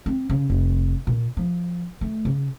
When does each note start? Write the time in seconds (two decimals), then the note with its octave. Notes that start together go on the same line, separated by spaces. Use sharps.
0.06 C4
0.30 C#3
0.50 F1
1.07 A#2
1.37 F3
2.01 A3
2.25 C#3